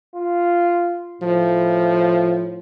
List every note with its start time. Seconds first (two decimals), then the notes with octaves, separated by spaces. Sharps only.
0.16 F4
1.22 A2 F3